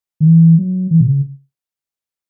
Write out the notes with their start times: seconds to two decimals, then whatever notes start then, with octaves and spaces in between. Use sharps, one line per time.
0.20 D#3
0.26 E3
0.58 F#3
0.91 E3
1.01 B2
1.07 C#3